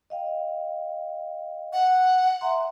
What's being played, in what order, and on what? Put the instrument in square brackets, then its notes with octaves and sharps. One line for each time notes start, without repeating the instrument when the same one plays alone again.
[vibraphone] D#5 F5 G5
[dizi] F#5
[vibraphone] E5 A#5 C6